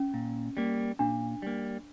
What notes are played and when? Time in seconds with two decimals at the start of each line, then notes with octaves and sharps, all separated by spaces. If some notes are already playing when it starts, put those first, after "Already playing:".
Already playing: C#4
0.14 A#2
0.57 G3 A#3
0.99 A#2 D4
1.42 G3 A#3